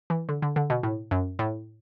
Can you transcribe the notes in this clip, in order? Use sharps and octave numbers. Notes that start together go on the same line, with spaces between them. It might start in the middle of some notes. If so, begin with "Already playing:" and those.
E3
D3
D3
D3
B2
A2
F#2
A2